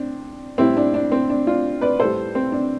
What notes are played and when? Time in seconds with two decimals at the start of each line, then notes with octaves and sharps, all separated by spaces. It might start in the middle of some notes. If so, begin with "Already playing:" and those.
Already playing: C4 D4
0.58 A2 G3 C4 E4
0.77 D4
0.94 D4
1.12 C4
1.30 D4
1.47 D4 F4
1.81 B4 D5
2.00 A2 G3 A4 C5
2.35 C4
2.52 D4